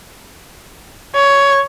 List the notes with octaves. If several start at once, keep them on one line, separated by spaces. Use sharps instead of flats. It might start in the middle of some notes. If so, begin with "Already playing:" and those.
C#5